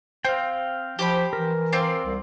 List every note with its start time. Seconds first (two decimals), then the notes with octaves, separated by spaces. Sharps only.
0.25 C4 F5 G5
0.99 F3 G4 C5 B5
1.33 E3 A#4
1.72 C4 F4 D5
2.05 C2